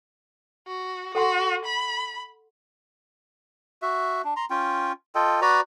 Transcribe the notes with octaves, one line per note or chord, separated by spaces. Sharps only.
F#4
F#4 A4 F#5 C6
B5
F#4 E5
D4
A#5 C6
C#4 F4 G5
F4 A4 D#5 G5
F#4 B4 D5 A#5